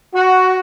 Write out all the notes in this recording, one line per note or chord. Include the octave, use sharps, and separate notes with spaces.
F#4